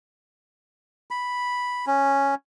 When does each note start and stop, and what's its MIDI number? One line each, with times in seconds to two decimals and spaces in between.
1.11 1.85 83
1.87 2.35 61